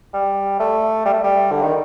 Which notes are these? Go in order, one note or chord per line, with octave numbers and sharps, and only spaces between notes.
G3
A3
G3
A3
G3
D3
D#3